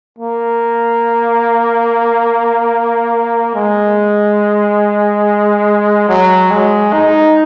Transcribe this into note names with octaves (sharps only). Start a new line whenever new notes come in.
A#3
G#3
F#3
G#3
D#4